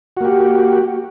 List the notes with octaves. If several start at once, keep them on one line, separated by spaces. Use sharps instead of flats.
A#3 F#4 G4